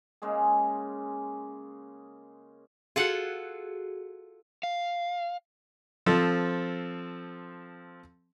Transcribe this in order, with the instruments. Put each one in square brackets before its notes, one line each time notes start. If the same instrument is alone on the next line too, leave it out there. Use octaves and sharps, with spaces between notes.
[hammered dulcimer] C#3 G#3 A#3 G#4
[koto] F4 A4 F#5 [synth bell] F#4 G#4
[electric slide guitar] F5
[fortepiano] F3 C4 A4